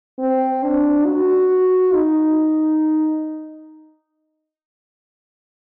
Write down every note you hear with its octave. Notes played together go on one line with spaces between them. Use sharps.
C4
D4
F#4
D#4